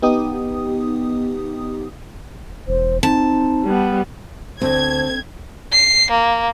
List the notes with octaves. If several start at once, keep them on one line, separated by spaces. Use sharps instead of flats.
B3 D#4 G4 D#6
E1 C5
C4 D#4 A5
G3 B3
D2 C4 C5 G#6
C7
A#3